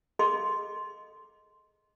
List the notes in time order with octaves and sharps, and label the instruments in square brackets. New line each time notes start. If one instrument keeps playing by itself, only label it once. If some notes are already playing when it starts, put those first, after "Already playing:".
[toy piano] G#4 A4 D#5 F5 C6 D6